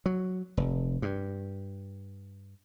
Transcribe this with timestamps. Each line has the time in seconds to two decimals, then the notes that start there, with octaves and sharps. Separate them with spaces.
0.06 F#3
0.57 F1
1.02 G2